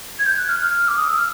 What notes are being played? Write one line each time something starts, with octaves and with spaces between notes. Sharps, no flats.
G#6
G6
F#6
F6
F6
D6
D#6
E6
F6